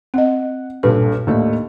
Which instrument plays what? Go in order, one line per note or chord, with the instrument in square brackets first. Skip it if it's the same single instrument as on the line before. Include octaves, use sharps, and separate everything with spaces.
[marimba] C4 D#5 [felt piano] F#5
[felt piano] B1 G2 [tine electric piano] A#2 A4 [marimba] B4
[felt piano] D#2 A3 D4 [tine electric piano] A2 A#3 D#5